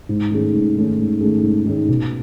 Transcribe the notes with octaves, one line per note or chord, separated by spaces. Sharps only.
G#2
D#3 A3 C#4 G#4
G#2
D#3 A3 C#4 G#4
G#2
D#3 A3 C#4 G#4
G#2
D#3 A3 C#4 G#4
B2